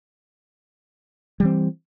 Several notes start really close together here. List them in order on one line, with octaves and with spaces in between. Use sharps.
G3 E3 C4